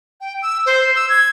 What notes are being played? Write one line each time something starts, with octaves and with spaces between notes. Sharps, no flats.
G5
E6
C5
E6
G#6